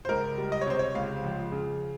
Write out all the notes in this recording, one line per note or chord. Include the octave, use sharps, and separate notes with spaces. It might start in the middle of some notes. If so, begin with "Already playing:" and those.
C5
C#2 A#4
G3
D#5
C#5
C3 C5
C#5
C#2 F5
F3
C#3